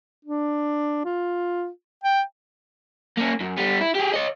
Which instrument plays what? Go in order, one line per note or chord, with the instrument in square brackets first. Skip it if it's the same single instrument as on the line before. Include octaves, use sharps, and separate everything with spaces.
[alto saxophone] D4
F4
G5
[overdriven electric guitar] A#3 C#4
F#2
G3 B3
E4
G4 G#4
C#5 D#5